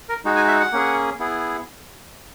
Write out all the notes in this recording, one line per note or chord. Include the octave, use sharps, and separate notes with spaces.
A#4
G#3 D#4 F#4
G#5
E5
F#5
A#3 C#4 G#4
B3 E4 G#4